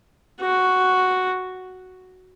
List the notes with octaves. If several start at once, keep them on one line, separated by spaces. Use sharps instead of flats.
F#4